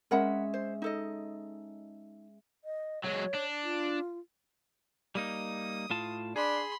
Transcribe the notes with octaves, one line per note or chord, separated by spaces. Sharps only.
G#3 C#4 A#4 E5 F#5 B5
C5
D#4 A4 D#5
D#5
F#3 G#3 C#5
D4
F4
G3 A#3 D#4 D#6
A2 F4 A5
D4 G#4 B5 C6